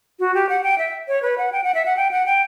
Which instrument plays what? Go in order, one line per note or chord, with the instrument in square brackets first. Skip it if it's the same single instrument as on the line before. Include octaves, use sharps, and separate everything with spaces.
[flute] F#4
G4
F#5
G5
E5
C#5
B4
F#5
G5
F#5
E5
F#5
G5
F#5
G5